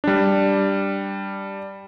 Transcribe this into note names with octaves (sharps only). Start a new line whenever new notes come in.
G3 D4